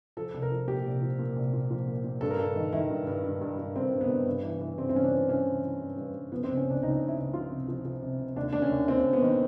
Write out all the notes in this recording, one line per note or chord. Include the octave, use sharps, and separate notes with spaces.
F3 A4
C2
A#4
F3
A#2 G4
C2
F3
A#2
C2
A#2
F3
A#2
A#2
G2 A4
A#4
G2 A4
D#3
D#3 E4
G2
G2
G2
G2
G2
G2 C4
G2
B3
G2
G2
E3
E3
G2 C4
C4
E3 C#4
D4
E3
E3 C#4
E3
E3
G2
G2
G2
F3 B3
C4
C#2
C#4
C#2 D4
C#2 D#4
C#2
E4
C#2
F3 F4
C3
F3
F3
C3
C3
D#2 D4
D#2 D4
C#4
D#2
D#2 C4
D#2
B3
D#3